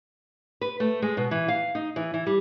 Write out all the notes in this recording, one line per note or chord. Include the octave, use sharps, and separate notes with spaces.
B4
A3
G#3
B2
E3
F5
D#4
E3
E3
G3